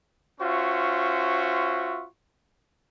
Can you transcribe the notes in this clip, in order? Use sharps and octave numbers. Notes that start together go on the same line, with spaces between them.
C#4 F4 F#4 C5 E5 C#6